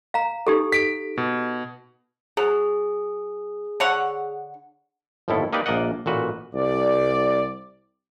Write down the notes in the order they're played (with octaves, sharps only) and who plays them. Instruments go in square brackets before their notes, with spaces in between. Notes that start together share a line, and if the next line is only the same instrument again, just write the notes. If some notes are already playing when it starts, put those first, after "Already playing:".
[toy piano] F5 A#5
D#4 G4 A4
[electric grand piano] B6 D7
B2
[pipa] F#3 [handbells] G#4
[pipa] D3 C#5 F#5
[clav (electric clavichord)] G1 D#2 A2 F3 E4 A4
A#3 D#4 G4 B4 D5
A#1 A#3 D5 D#5 F#5
A1 A#2 F#4 B4
[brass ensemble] C2 D5